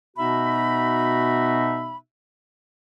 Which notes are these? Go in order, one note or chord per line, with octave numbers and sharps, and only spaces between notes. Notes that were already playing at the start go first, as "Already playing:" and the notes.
B2 B3 D#4 F#4 E5 B5